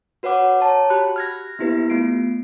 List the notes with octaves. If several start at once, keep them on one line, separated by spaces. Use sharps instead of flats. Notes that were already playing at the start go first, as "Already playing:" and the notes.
F#4 B4 C#5 F#5 D6
C#5 A5 A#5
F#4 G4 B5 F#6
F6 G#6 A#6
A#3 B3 E4 G4 B4
A3 B3 F4 C7 D7